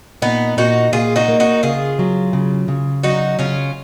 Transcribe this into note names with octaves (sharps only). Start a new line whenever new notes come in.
A#2 B3 D#4
A#2 D#4 F#4
A#2 F4 G#4
D#4 F#4
A#3
D#4 F#4
C#3 F4 G#4
F#3
C#3
C#3
F#3 D#4 F#4
C#3 C#4 F4